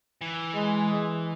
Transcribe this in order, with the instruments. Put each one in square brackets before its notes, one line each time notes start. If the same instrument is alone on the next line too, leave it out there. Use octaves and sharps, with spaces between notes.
[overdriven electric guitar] E3
[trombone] G#3